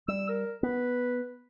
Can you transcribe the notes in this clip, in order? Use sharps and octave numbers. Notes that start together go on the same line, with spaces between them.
G3 E6
A#4
B3 B4